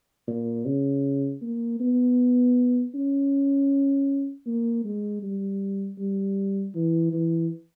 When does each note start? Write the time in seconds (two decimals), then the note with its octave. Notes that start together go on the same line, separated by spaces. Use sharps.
0.28 A#2
0.66 C#3
1.42 A#3
1.80 B3
2.94 C#4
4.46 A#3
4.85 G#3
5.23 G3
5.99 G3
6.75 E3
7.13 E3